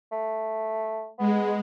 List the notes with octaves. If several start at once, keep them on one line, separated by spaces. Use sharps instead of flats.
A3
G#3 B3